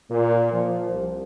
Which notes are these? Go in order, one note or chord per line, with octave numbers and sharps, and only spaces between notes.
A#2
F3
C2